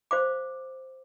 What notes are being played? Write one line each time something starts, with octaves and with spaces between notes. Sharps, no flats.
C5 F5 D6